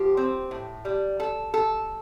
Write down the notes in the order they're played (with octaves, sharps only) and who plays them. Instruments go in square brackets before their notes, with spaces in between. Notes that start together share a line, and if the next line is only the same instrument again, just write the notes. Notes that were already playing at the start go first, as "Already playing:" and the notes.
Already playing: [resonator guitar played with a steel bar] F3 G4
C4
A2
G3
A4
A4